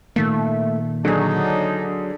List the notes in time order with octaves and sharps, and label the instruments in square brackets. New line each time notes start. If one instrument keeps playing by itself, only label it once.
[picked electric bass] A#2 D#3 A#3 [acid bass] A3
[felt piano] D3 G#4 [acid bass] F#3 [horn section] D4 D#4